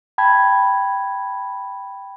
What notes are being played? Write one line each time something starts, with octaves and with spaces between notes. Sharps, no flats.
G5 A5 B5 G#6